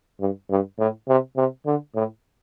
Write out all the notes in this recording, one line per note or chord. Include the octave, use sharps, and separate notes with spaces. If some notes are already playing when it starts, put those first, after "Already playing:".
G2
G2
A2
C3
C3
D3
A2